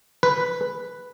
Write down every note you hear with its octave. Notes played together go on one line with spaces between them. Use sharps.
B4